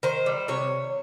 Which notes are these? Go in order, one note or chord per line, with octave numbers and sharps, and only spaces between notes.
D#3 C5
G3
C3 C#5